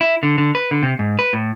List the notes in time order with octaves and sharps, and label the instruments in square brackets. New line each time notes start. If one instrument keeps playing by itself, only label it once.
[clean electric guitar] E4
D3
D3
B4
D3
C3
G#2
B4
A2